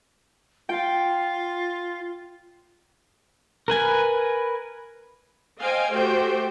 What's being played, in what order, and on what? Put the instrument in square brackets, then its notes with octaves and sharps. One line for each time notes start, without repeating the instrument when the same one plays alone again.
[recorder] F4 [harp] G5
[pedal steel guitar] A#4 B4 G#5
[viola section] C5 D#5 F5 G5 G#5
A3 F#4 G4 C5 G5